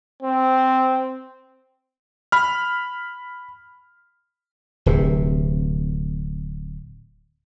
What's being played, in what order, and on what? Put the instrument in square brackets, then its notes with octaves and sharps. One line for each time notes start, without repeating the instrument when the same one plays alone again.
[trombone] C4
[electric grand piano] B5 F6
[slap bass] D1 C3